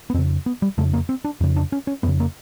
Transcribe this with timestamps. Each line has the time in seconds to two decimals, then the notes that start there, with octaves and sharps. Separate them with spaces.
0.10 B3
0.14 F2 C4
0.18 C#3
0.46 B3
0.62 G3
0.78 F2 C#3 A3
0.93 A#3
1.09 C4
1.25 D4
1.41 F2 C#3
1.56 D4
1.72 C#4
1.87 C#4
2.03 F2 C#3 B3
2.20 A#3